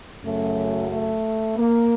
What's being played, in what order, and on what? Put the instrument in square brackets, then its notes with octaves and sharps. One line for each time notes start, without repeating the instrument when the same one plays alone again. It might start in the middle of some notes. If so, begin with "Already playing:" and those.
[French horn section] F#2 C#3 F#3 A3
A3
A#3